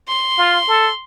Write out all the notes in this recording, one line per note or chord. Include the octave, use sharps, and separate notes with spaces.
C6
F4
A4